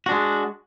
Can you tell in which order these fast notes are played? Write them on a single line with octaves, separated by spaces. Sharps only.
F#4 D4 G#3